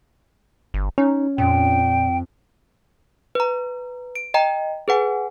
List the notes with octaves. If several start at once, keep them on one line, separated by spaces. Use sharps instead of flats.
G1
C#4 D#4
F2 A#2 G5
B4 A#5
D7
D#5 G5 A#5
G#4 B4 F#5 G#5